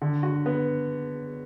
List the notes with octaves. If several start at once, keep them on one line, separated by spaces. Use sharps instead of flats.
D3
F#4
B3